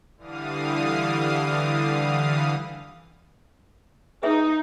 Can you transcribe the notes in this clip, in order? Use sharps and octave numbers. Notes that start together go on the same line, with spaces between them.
D3 E3 G3 F5 D#6
D#4 G#4 B4 E5